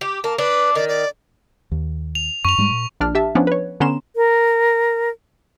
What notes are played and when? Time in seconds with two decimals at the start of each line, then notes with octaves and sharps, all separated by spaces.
0.01 G4
0.24 A#3 A5
0.38 D4 B4
0.75 D#3 D5
0.88 D5
1.72 D#2
2.15 F7
2.45 F#2 C#6 F7
2.58 G#2 G3 G#3
2.71 A#2
3.00 A#1 D4 F6
3.15 G4 E5 A5
3.35 F3 B3 C#4 D4
3.47 B4 C#5
3.80 D3 B3 C#4 A#5 C6 E7
4.16 A#4